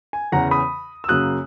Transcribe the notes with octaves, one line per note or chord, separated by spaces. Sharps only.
G#5
E2 C#3 E3 F#5 A#5
B5 D#6
E6
F#2 C#3 F#3 A#3 D#6 F#6